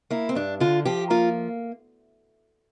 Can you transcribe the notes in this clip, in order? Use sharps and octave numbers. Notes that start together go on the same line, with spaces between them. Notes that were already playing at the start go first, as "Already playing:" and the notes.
A#3 E4
C4
G2 D4
D3 F4
F3 G4
A#3 F4